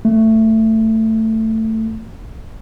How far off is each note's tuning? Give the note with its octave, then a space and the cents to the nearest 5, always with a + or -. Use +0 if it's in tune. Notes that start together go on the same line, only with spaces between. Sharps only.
A3 +15